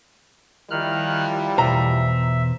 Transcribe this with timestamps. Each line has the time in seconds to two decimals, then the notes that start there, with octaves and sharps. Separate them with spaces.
0.70 D#3 F3 G3 E4 F6 F#6
1.58 E2 B2 C5 E5 A#5